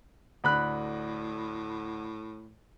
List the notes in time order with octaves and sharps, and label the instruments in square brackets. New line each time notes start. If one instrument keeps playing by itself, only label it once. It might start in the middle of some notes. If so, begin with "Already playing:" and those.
[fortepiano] D2 B5 F#6 [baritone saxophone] A2